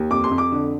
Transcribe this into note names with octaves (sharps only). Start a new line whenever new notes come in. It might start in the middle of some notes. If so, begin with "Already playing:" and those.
Already playing: D#2
F2 D6
C6
F2
D6
D3